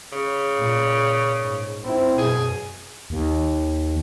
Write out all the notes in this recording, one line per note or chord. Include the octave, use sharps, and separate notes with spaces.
C#3
A#2
G#2
C4 E4
F#2 B2 G#4
D#2